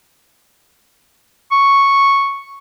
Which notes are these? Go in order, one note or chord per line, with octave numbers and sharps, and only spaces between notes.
C#6